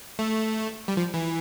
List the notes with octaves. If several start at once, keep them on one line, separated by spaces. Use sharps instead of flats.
A3
G3
F3
E3